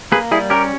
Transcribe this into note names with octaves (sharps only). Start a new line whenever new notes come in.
A#3 G#4 B4
G3 E4 G#4
C#4 G4 A#4